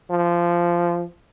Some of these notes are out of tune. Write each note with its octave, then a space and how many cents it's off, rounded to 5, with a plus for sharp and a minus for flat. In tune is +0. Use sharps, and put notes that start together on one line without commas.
F3 -15